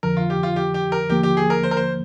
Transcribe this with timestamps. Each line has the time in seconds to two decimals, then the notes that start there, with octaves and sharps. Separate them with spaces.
0.03 F2 D3 F3 A#4
0.17 F4
0.30 G4
0.43 F4
0.56 G4
0.74 G4
0.92 A#4
1.10 D#2 D3 F3 A#3 G4
1.23 G4
1.37 G#4
1.50 A#4
1.63 C5
1.71 A#4
1.77 C5